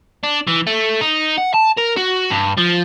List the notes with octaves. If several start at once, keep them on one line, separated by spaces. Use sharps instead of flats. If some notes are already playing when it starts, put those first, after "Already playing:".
D4
E3
A3
D#4
F#5
A5
A#4
F#4
G2
F3